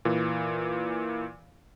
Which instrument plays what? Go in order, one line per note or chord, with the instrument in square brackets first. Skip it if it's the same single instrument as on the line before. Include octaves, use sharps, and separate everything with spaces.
[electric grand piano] A#2 E3